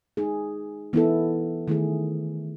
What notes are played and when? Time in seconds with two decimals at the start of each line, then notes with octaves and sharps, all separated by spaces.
0.17 G#3 D#4 G#4
0.93 E3 B3 E4 A4
1.68 D#3 A3 E4 G#4